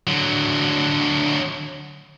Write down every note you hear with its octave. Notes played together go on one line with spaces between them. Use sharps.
D3 F#3